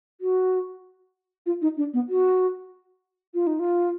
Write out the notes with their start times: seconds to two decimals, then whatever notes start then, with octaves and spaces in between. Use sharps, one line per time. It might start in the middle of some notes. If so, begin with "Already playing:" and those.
0.21 F#4
1.46 F4
1.62 D#4
1.77 D4
1.94 B3
2.09 F#4
3.34 F4
3.47 D#4
3.59 F4